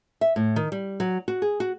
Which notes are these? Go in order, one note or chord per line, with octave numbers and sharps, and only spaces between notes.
E5
A2
D#3
G3
F#3
F#4
G#4
F#4